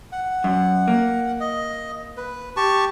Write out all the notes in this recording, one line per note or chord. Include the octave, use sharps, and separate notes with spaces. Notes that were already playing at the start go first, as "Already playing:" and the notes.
F#5
F#2
A#3
D#5
B4
G4 A5 C#6